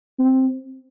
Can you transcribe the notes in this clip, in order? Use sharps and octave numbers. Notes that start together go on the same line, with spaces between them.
C4